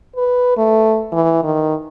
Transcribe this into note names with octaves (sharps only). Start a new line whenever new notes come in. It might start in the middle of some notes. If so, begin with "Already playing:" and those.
B4
A3
E3
D#3